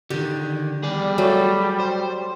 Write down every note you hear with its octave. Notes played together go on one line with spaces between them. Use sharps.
D3 D#3 G4
G3 G#4 D5
F#3 A3
C5